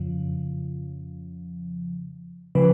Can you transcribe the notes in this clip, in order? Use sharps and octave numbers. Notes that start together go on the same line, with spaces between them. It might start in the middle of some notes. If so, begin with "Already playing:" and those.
Already playing: F2 C#3 F3
C#3 F3 B4